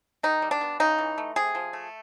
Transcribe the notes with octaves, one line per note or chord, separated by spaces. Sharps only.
D#3 D#4
G3
D4
B3
C#3 D#4
E3
A3
C3 G#4
F3
A3